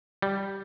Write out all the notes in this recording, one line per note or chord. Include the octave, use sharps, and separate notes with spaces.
G3